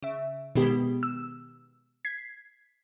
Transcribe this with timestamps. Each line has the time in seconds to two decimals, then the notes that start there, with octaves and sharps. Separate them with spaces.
0.03 C#3 E5
0.56 B2 D#3 G#3 B3 G4
1.03 E6
2.05 G#6 B6 C7